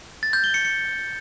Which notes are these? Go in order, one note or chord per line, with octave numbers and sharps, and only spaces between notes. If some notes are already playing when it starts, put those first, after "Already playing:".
A6
G6
G7
C#7
C#7